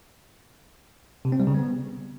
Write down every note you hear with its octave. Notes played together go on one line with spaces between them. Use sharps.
C3
C4
G3
C#3
B3